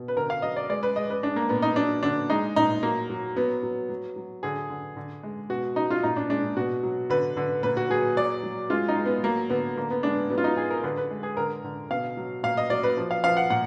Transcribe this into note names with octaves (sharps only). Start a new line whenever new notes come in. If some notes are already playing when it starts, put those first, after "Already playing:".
Already playing: B2
B4
D3 A#4
F5
F#3 D#5
D5
G#3 D5
B4
G#3 D#5
B4
G#3 D4
A#3
A#2 B3
D#4
F#3 D4
D3 D4
G#3 D#4
A#2 D#4
F#3 A#3
F#3
F#3 B3
F#3
F#3
F#3
D3 G#4
D3
D3
G#3
B2 F#4
F#3 D#4
F4
A#2 D#4
D4
G#3 D4
B2 F#4
F#3
D3 B4
D3
A#2 B4
F#4
F#3 G#4
F#3 D5
F#3
G#3 F4
D#4
G#3
B3
F#3 A#3
D3 B3
D3 A#3
B3
G#3 D4
F#3 B3
F4
D#4
F#3 G#4
A#4
D3 B4
B4
G#3
G#4
D3 A#4
D3
B2 F5
F#3
A#2 F5
D#5
F#3 D5
B4
F3
F5
F3 F5
F#5
A#2 F#5